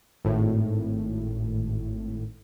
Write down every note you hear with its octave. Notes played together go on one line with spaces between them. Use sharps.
G#1 A2